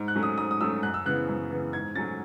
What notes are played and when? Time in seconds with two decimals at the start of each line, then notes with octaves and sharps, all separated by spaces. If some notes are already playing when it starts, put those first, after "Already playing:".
Already playing: G#2
0.08 F#6
0.15 F#3 A3 C#4
0.23 D#6
0.38 G#2 D#6
0.51 D#6
0.61 F#3 A3 C#4 E6
0.83 F#2 F#6
0.94 E6
1.05 C#3 E3 B3 F#6
1.29 F#2
1.50 C#3 E3 B3
1.73 G#2 G#6
1.95 F#3 A3 C#4 A6